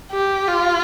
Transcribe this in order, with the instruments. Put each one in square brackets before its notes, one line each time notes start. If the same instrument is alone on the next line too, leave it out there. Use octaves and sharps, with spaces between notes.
[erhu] G4
F4